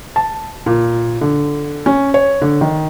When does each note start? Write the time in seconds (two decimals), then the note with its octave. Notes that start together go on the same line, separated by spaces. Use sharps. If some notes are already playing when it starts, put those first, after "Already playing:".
0.16 A5
0.66 A#2
1.21 D3
1.86 C#4
2.14 C#5
2.42 D3
2.61 D#3